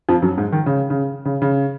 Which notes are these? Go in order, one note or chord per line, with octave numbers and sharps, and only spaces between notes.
F2 F3
F#2 F#3
G#2 G#3
D#3
C#3
C#3
C#3
C#3